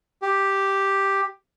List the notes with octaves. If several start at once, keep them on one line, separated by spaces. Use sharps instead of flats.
G4